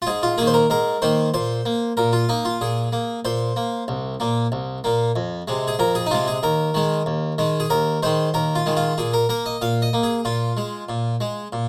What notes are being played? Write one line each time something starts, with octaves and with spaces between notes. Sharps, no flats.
F4
G#2 G#4
F4
D#3 A#3 G#4
C5
A#4
G#2 A#4
D#3 A#3 C5
A#2 C5
A#3
A#2 A#4
F4
A#3 D#4
F4
A#2 G#4
A#3
A#2 C5
A#3
C2
A#2 A#3
C2
A#2 A#3
F2
C3 G#3
G#4
F2 A#4
G#4
D#4
C3 G#3 F4
G#4
D#2 A#4
D#3 G#3
D#2
D#3 G#3
G#4
D#2 A#4
D#3 G#3 C5
D#2 A#4
F4
D#3 G#3
F4
A#2 G#4
A#4
A#3 A#4
D#5
A#2 F5
D#5
A#3
G#4
A#2 F4
G#3
A#2
G#3
A#2